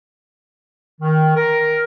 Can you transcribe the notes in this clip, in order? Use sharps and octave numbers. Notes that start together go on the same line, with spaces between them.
D#3
A#4